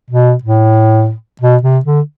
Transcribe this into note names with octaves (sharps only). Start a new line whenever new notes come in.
B2
A2
B2
C3
D3